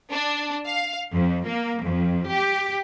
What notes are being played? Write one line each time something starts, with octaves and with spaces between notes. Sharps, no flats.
D4
F5
F2
A#3
F2
G4